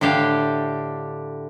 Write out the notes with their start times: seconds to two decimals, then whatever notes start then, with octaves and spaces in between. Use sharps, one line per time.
0.01 A2 D3 D4 G4 F5